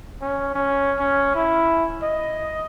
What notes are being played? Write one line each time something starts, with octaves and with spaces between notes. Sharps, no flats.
C#4
C#4
C#4
E4
D#5